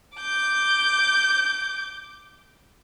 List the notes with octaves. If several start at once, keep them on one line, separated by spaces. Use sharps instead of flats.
D6 G6